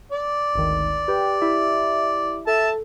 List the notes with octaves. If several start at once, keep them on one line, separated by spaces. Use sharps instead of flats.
D5
G#1 D2 D#3
G4 B4 G5
E4 G4 E5
A4 E5 A5